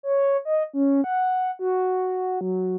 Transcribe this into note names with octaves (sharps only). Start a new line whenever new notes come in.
C#5
D#5
C#4
F#5
F#4
F#3